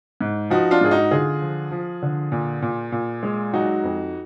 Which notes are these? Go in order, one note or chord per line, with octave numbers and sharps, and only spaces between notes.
G#2
F3 D#4 F#4
D4 F4
G#2 G#4
D#4 F#4
D3 F4 G#4
F3
F3
D3
A#2
A#2
A#2
G#3
F#3 D#4 F#4
F2